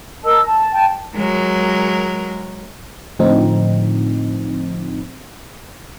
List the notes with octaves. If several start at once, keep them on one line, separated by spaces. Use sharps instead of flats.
A#4 D#5 A5 E6
A5
G5 A5
F#3 G#3 A#4
A2 D3 F3 C4 D#4